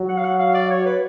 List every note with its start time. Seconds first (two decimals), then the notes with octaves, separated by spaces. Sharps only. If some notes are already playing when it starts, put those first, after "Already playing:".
Already playing: F#3
0.09 F#5
0.17 F5
0.24 F#5
0.40 F5
0.55 D5
0.71 C#5
0.86 B4